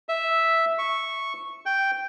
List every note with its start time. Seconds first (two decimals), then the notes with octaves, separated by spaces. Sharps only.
0.09 E5
0.78 C#6
1.66 G5